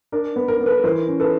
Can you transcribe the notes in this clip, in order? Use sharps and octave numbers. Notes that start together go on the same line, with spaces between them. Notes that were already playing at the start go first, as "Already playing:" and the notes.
D4 A#4
B3
A#4
B3
A4 B4
E3 A#4 C5
C#4
A4 B4